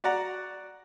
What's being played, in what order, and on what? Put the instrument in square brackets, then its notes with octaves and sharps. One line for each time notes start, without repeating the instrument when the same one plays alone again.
[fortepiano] F#4 D5 F#5 A#5